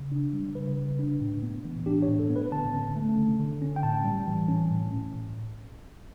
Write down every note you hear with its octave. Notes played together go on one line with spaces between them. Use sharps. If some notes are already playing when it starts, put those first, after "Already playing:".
Already playing: C#3
D4
G3
C#3 B4
C#3
D4
A2
B3
E3
D4 G4
C#5
A2
A4
B3
B4
D3 A5
C#4
A3
D3
D3
C#4
G5
A2 A5
G3
E3
C#4
A2